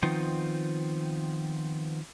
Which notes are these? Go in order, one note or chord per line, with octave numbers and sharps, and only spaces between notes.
D#3 F3 B3 C4 D#4 F4